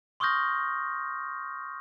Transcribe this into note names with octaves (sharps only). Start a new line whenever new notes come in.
C6 C#6 D#6 F6 G6 A#6